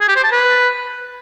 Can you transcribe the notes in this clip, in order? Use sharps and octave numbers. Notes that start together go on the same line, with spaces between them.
G#4
G4
C5
A5
B4